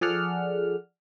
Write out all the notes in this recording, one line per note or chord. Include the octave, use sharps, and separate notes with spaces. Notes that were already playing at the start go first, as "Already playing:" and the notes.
F3 G#4 A4 D5 F#5 F6